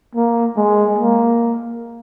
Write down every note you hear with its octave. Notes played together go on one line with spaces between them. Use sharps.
A#3
G#3
A#3